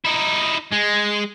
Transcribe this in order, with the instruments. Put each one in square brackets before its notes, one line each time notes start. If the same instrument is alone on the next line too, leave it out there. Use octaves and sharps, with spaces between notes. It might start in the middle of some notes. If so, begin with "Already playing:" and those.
[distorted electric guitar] D#4 E4
G#3